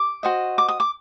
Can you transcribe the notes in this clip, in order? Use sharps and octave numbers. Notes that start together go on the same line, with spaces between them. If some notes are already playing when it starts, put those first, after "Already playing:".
Already playing: D6
F#4 C5 D#5
D6
D#6
D6